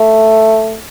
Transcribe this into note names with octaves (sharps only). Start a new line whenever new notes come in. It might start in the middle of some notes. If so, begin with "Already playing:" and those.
Already playing: A3